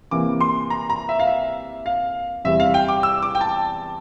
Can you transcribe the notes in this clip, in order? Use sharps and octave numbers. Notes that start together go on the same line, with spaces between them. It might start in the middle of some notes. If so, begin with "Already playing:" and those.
C3 E3 A#3 D6
C6
A#5
A#5
E5
F5
E5
F5
E2 C3 G3 E5
F5
G5
D6
E6
D6
G5
A5